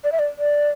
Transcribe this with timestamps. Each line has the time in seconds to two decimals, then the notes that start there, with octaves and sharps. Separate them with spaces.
0.04 D5
0.12 E5
0.19 D5
0.38 D5